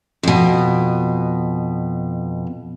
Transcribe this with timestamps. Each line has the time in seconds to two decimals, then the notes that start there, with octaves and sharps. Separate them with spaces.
0.23 F2 B2